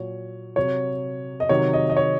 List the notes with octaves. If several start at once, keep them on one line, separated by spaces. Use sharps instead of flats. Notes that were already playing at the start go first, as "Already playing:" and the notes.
Already playing: A#2 F#3 C#5
C3 F#3 C#5
D#5
C3 D#3 F#3 C#5
D#5
D#5
C#5